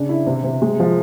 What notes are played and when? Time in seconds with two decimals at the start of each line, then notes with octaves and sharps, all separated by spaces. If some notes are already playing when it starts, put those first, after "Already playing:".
Already playing: C#3 D4
0.09 E4
0.27 C3
0.44 C3
0.62 G#3
0.80 F3